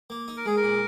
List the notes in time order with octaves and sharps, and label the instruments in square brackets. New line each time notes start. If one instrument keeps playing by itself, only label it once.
[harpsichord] A#3
D#4
[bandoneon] A#4
[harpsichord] G#3 [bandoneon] G#4
[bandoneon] A#4
[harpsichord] A#2